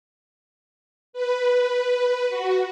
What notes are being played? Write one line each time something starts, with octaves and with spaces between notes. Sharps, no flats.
B4
F#4